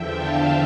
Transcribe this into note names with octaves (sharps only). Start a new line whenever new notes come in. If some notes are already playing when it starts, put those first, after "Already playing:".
Already playing: E2 D3 F3 E5 G5
F5 A5